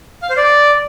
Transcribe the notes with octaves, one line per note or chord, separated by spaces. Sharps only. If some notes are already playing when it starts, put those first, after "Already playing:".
F5
C5
D5